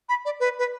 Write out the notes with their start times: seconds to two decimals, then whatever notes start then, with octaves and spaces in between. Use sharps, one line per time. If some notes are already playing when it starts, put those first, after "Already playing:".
0.09 B5
0.25 D5
0.40 B4
0.59 B4